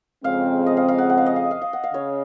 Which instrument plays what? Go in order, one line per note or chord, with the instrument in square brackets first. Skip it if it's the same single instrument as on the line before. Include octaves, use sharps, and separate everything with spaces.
[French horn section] F2 C#3 G#3 C4 [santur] F5
[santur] D#5
F5
F5
F#5
F#5
F5
D#5
F5
F5
F5
F#5
F5
[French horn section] C#3 [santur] C#5